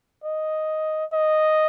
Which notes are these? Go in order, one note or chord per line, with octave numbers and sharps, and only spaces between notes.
D#5
D#5